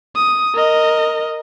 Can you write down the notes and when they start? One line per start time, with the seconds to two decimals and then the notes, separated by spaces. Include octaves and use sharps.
0.15 D#6
0.55 A#4 D#5